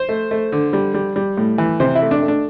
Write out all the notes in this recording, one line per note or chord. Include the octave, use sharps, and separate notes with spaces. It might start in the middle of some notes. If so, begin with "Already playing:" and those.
Already playing: C5
A3
A3
D3
G3
G3
G3
A2
E3
C3 C5
E4
A3
D4
A3
D4